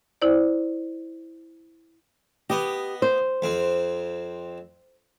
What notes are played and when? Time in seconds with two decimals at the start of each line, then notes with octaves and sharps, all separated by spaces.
0.22 E4 C5 D5
2.50 B3 G4 D#5
3.02 C5
3.42 F2 C4